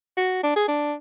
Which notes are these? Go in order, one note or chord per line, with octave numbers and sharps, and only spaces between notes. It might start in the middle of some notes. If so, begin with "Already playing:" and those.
F#4
D4
G#4
D4